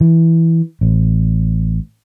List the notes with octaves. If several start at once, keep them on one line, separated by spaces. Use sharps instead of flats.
E3
A1